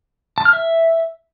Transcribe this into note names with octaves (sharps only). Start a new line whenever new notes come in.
A5
F6
E5